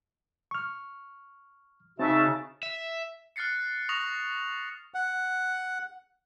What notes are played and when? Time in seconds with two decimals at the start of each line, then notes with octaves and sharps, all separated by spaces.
0.51 C#6 F6
1.99 C#3 C4 D#4 F#4 E5 A5
2.63 E5
3.36 F6 F#6 A6 C7 C#7
3.89 C#6 D#6 A#6 F7
4.94 F#5